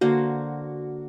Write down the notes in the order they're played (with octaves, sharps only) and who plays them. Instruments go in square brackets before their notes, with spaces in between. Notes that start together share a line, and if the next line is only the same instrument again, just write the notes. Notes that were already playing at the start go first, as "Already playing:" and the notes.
[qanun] D3 A#3 C5 [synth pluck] F#4